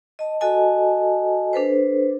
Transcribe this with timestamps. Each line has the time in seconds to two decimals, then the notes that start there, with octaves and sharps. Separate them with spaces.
0.19 D#5 A5
0.41 F#4 A4 D#5 G#5 A5
1.53 D4 A4 B4 C5